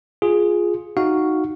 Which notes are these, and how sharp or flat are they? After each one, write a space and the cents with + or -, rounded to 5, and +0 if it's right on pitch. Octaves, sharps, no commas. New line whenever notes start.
F4 +10 G#4 +0
D#4 +0 F#4 +0 F5 +0